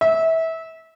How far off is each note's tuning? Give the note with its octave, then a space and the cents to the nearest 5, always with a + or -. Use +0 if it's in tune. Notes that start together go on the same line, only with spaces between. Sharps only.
E5 -25